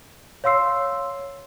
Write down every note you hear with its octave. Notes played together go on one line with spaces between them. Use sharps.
C#5 F5 C6 E6 C7